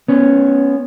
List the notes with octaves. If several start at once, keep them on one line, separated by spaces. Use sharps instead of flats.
B3 C#4